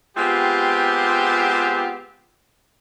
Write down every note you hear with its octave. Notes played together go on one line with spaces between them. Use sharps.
G#3 B3 C4 F4 G4